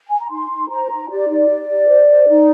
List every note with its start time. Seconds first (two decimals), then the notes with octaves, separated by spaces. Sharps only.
0.08 G#5
0.19 A#5
0.31 D#4 C6
0.50 D#4
0.70 C5 A#5
0.90 D#4
1.09 G4 D5
1.29 D#4
1.48 G4
1.68 G4
1.88 C5
2.07 C5
2.27 D#4